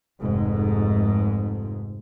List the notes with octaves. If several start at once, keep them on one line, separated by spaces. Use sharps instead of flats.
F1 G#2